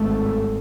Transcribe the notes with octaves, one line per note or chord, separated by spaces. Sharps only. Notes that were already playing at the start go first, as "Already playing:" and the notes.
Already playing: G#1 G2 A3